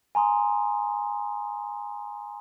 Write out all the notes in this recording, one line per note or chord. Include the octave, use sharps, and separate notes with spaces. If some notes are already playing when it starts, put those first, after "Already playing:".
G#5 A#5 C6 D#6